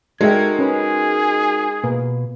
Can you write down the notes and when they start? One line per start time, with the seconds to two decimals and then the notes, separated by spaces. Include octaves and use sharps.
0.21 G#3 D#4 F#4 A4 A#4 E5 G5 G#6
0.59 C#4 G#4 B4 B5
1.84 B2 A#3 B4